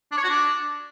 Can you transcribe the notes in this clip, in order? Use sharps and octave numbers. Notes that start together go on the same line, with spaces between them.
D4
C#5
F#4
D4